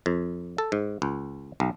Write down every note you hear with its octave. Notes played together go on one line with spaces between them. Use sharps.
F2
A4
G#2
C#2
B1